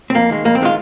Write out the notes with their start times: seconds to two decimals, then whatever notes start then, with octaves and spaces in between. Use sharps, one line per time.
0.10 C4
0.14 F2 A#3
0.30 D#3 G#3
0.44 F2 A#3
0.55 C4
0.61 D#3 G#3 F4